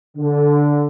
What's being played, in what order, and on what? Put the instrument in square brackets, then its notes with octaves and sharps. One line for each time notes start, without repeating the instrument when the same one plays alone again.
[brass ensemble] D3